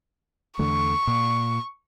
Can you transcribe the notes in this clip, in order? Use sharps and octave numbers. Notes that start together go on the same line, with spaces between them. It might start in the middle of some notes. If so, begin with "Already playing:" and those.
E2 D3 A3 C#6
A#2